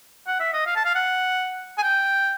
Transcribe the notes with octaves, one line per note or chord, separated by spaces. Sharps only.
F#5
E5
D#5
F5
A5
F5
F#5
G#5
G5